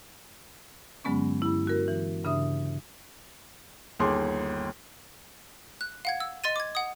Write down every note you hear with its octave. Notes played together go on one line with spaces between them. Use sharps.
G2 D3 F#3 G#3 B3 C#4
G2 E4
F#4 A#4
E3
G2 C#3 D4 E5 D#6
G1 D#2 G#4 C6 D6
F#6
F5 F#5 G#6
E6
D#5 C6 A6 D#7
D6 G#6
F#5 D#6